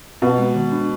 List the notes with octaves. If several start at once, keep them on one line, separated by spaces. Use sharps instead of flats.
B2 B3
G#3
D#3
D4